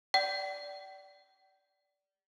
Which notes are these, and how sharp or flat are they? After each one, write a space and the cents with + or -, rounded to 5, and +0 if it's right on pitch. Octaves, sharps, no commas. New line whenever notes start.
D5 -15 G5 -45